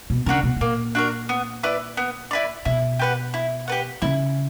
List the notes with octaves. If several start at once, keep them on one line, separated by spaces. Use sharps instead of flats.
B2
C#3 D4 F#4 A#4
B2
B2
A#2 A#3
D4 F#4 A#4
B3
E4 B4 D5
B3
E4 B4 D5
B2 E4
G4 B4 F#5
E4
G4 B4 F#5
C#3 E4